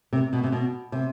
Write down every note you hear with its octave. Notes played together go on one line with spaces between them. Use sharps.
C3
B2
C3
B2
C3